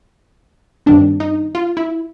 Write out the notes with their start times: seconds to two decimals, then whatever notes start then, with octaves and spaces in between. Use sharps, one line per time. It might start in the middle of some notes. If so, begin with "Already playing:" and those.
0.86 G2 D#3 G3 C4 D4
1.20 D#4
1.55 F4
1.77 E4